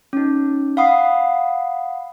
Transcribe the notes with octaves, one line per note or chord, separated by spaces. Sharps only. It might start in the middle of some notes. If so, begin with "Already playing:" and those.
C#4 D#4
F5 F#5 B5 D#6 C7